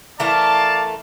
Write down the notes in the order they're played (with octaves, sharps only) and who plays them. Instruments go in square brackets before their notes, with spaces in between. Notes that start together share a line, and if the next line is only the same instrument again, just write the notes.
[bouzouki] E3 A3 A#4 [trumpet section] D5 F5 A5